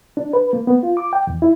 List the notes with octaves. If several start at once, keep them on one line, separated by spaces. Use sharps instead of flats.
D4
B4
A#3
B3
F4
D6
G5
E2
E4